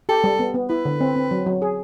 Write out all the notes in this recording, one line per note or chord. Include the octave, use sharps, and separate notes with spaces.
G4 A4
G3
B3
B3
E4 B4
D3
C4
C4
F#3
F#3
G#4